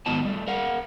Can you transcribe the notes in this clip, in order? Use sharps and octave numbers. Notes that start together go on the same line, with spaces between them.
G#2 D#3 F#3 B3 D#5 A5
G3 A3
A#4 F5 F#5